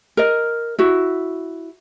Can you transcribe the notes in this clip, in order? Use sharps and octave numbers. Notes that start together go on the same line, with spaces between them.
A#4 D#5
E4 F#4